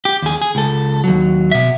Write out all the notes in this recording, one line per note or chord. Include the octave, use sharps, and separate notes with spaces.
G4
D#2 G#4
G#4
C#2 A4
D#2 F#3
B2 E5